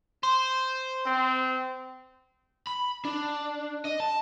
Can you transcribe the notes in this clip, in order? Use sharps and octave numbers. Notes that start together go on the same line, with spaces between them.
C5
C4
B5
D4
D#5
A5